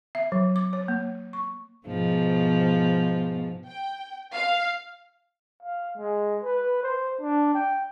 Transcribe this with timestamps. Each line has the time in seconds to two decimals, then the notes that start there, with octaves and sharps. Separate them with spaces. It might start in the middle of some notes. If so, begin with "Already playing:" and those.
0.15 E5
0.32 F#3
0.56 D6
0.73 C#5
0.88 A#3
1.33 C#6
1.87 G#2 B2 F3
3.66 G5
4.33 F5
5.63 F5
5.97 G#3
6.43 B4
6.83 C5
7.21 D4
7.55 G5